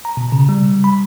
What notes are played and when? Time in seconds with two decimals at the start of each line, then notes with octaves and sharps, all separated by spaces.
0.05 A#5
0.17 B2
0.32 C#3
0.49 G3
0.84 B5